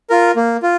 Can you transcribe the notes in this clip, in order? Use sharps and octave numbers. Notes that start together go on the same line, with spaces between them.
F4 A#4
A#3
F4